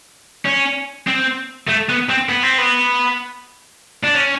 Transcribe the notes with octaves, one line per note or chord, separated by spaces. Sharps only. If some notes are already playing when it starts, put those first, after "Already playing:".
C#4
C4
A3
B3
C4
B3
C4
B3
D4
C#4